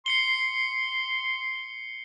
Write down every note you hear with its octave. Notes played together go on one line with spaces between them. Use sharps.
C6 C7 C#7 G7